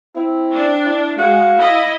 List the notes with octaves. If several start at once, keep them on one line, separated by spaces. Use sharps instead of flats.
C4 E4
D4
E4
G#3 F#4 F5
E4 D#5